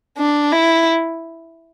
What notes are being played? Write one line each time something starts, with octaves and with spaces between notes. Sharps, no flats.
D4
E4